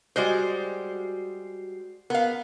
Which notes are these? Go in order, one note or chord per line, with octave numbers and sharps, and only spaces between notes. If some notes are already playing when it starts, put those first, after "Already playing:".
G3 G#3 F#4 C5 C7
B3 A#4 F5